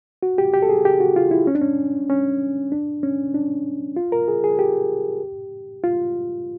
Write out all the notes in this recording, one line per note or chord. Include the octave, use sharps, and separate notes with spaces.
F#4
G4
G4
A4
G#4
G4
F#4
F4
E4
C#4
D4
C#4
C#4
D4
C#4
D4
F4
A#4
G#4
G#4
G4
F4